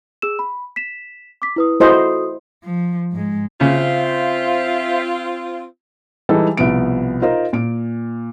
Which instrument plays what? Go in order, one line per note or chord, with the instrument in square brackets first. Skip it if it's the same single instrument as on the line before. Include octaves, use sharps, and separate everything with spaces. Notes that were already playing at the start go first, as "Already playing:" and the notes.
[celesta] G#4 E6 E7
B5
B6 E7
D6 B6
E4 B4 D#6
[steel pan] E4 C5 D#5 [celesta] F#4 A4 D#6
[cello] F3
G#2 G#3
[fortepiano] C#3 [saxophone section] C4 F4 [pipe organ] C5 E5 F5
[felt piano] E3 G3 G#3 D#4 A4
C2 B2 F3 B3 D7
D#4 F4 A#4 C5 D#5
A#2 D7